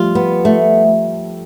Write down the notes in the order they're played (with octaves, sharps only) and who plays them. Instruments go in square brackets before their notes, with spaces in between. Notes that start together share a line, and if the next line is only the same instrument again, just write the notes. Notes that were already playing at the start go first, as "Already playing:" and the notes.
Already playing: [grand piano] F3 G3 A3 [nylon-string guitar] F4
[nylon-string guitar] B3
A3